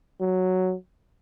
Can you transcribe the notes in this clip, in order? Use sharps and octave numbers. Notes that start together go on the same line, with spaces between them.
F#3